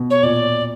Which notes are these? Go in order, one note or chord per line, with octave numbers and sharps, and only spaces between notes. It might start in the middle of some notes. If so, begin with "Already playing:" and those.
Already playing: B2
C#5
A#2 D5